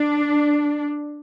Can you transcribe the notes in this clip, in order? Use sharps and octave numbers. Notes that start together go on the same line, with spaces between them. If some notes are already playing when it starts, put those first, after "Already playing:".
Already playing: D4